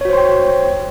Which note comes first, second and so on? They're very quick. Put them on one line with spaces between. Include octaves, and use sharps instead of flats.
C#5 F#4 C5 C6 G5